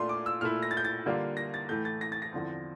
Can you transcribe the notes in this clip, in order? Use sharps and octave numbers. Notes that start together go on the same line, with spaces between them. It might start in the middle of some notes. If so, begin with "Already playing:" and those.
Already playing: A#2 A3 D4 F4 C6
D6
E6
A#2 A3 E4 F6
A#6
A6
G6
A6
D3 G3 A#3 D4 F4
A#6
A6
A2 E3 A3 G6
A6
A#6
A6
A#6
E2 D3 F3 C4